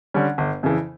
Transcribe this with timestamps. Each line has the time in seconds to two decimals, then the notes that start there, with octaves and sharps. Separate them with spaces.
0.14 D3 G3 C#4
0.38 G1
0.63 F2 C#3 E3